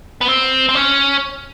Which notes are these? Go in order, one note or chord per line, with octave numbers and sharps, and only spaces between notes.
B3
C4
C4
C#4